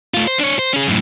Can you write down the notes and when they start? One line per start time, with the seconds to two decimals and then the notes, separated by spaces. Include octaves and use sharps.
0.14 A3 F4
0.28 C5
0.39 D4 C#5
0.59 C5
0.73 C#4 G#4
0.87 F#2 A2